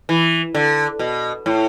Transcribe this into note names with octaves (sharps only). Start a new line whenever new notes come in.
E3
D3
B2
A2